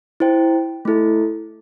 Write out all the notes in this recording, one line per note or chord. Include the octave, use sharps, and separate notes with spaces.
E4 C5 G5
A3 E4 A4